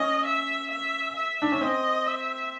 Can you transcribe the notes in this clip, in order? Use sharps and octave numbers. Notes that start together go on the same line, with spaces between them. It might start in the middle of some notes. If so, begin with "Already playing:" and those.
Already playing: C#4 D#5
E5
E5
E5
D4
C#4
C4 D#5
E5